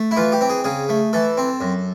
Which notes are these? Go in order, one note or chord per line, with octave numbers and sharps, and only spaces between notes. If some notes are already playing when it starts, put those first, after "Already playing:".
Already playing: A3
E4
E3 F4
G4
C4
G#4
C#3 G#4
A3
E3 A4
C4
F#2